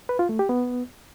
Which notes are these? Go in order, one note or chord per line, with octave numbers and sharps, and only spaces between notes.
B4
F4
A3
G4
B3